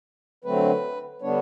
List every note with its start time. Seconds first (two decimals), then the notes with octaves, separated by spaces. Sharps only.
0.44 D3 F#3 A3 C4 B4
1.22 D3 G3 B3 D4 C#5